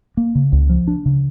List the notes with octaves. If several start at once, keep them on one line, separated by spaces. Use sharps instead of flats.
A#3
C#3
C#2
F3
D4
C#3